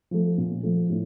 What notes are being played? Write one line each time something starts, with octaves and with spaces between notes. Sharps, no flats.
F3 A3
A#2
F3 A3
A2